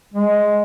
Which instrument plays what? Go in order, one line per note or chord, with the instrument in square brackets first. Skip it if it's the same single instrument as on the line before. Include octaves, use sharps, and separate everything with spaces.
[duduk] G#3